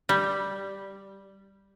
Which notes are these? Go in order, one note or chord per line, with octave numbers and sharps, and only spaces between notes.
G3